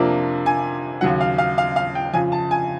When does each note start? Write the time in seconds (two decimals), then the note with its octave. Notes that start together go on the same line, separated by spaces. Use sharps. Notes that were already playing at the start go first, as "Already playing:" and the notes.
Already playing: F2 C3 F3 A#3 D4
0.46 G#5
1.01 D#2 C#3 F#3 F#5
1.21 F5
1.38 F5
1.58 F5
1.76 F5
1.95 G5
2.13 F2 C#3 F3 G#5
2.32 A5
2.51 G#5